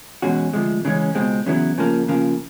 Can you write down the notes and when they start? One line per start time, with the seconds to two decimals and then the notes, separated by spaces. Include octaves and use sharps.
0.22 E2 B2 G#3 C#4 F#4
0.53 D2 C3 F3 G#3
0.85 C#3 E3 G#3 C#4
1.15 C#2 B2 G#3 C4
1.46 E2 C#3 F#3 B3 E4
1.78 C#3 F3 A#3
2.08 C#3 F3 A#3